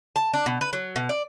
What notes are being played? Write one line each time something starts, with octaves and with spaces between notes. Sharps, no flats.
A5
D4
B2
B4
F#3
B2
D5